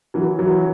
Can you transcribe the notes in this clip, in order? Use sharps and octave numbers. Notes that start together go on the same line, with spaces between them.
E3 F#3
E3 F#3